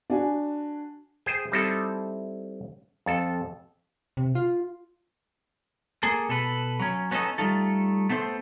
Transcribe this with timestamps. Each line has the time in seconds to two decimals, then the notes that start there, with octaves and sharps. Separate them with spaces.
0.10 D4 F#4 G#5
1.26 G#4 C5 G5
1.52 G3 C4 D#4 E4 A4
3.06 F2 A4
4.17 C3
4.35 F4
6.03 A#3 G#4 A4
6.29 B2 A4 B4
6.79 F#3 C#4
7.11 B3 C#4 D#4 A4 D#5
7.38 G3 A3 D#4 F4 A4
8.10 A3 B3 A4 C5